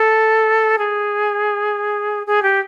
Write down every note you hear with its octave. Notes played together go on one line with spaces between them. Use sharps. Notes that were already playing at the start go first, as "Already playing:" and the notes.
Already playing: A4
G#4
G#4
G4